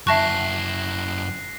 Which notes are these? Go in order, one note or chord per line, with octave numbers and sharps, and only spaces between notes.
F#2 E4 E5 A5 C#6 F#6 A#6 C7